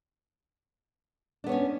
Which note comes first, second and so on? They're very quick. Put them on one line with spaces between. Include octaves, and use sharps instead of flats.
D4 B3 C#5 C#4